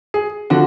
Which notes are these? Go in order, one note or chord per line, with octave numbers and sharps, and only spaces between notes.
G#4
D3 F3 F#4